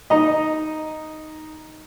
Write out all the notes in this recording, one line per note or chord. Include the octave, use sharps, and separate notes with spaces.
D#4 D#5